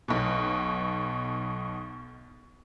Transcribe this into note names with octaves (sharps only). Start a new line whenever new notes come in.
B1 B2